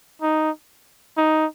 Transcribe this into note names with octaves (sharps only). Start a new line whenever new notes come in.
D#4
D#4